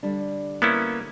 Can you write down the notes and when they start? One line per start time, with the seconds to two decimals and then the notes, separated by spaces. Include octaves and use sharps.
0.03 D3 G3 D4
0.62 A#3 B3 C#4 E4